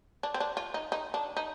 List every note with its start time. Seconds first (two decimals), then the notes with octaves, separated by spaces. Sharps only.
0.23 D4
0.34 C4
0.40 D4
0.57 F4
0.74 D#4
0.92 D#4
1.14 D4
1.37 D#4